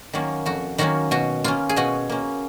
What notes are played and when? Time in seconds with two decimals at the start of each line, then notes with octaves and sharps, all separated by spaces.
0.13 D#3 F#3 A#3 C#4
0.46 F2 F#4
0.78 D#3 F#3 A#3 C#4 F#4
1.11 B2 F#4
1.44 A#3 C#4 F4
1.69 G#4
1.76 B2 F#4
2.09 A#3 C#4